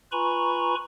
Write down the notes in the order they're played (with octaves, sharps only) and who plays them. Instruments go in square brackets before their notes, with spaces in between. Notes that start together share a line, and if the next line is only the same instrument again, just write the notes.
[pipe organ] F4 B4 G#5 A#5 B5 C#6